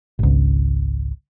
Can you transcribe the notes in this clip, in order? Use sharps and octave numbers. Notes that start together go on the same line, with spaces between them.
G#1 C#2